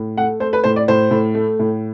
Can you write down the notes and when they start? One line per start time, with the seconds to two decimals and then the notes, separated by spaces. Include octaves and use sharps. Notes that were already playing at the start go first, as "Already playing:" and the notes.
Already playing: A2
0.17 A3 F#5
0.40 A3 C5
0.53 B4
0.64 A2 C5
0.76 D5
0.88 A2 C5
1.11 A2
1.34 A3
1.59 A2